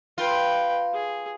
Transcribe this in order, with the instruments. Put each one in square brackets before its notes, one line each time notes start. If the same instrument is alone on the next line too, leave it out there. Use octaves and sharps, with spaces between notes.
[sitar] F4 [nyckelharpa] B4 G5
[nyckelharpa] G#4